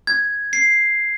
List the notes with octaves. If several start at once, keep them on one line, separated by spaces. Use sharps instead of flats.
G#6
C7